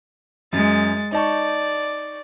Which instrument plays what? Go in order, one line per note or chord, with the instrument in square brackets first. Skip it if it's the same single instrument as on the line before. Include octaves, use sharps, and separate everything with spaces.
[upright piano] F#2 [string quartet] G#3 A6
[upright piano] D#4 A5 C#6 [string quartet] D5